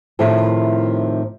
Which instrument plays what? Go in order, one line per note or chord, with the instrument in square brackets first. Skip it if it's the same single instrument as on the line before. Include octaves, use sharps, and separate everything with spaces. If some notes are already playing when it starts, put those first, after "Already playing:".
[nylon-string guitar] A2 C3 D#3 F3 E4